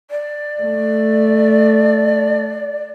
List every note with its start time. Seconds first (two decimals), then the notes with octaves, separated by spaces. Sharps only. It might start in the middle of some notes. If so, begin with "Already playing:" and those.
0.11 D5
0.61 A3